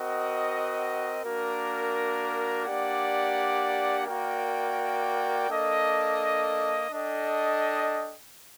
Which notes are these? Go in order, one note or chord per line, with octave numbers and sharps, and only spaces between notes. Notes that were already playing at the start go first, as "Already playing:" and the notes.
Already playing: C4 F#4 A#4 D#5 F#5
A#3 D4 F#4 A#4
A#3 D4 G4 D5 F#5
A#3 F#4 A#4 D5 G5
A#3 D4 A4 D#5
D4 A4 D#5 G5